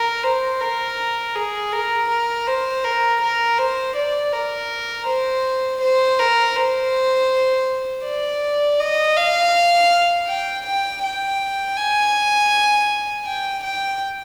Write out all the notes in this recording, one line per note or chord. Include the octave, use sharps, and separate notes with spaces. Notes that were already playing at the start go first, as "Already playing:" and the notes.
Already playing: A#4
C5
A#4
G#4
A#4
A#4
C5
A#4
A#4
C5
D5
A#4
C5
C5
A#4
C5
D5
D#5
F5
G5
G5
G5
G#5
G5
G5